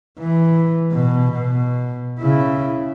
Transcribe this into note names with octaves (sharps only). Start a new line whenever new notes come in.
E3
B2
B2
C#3 E4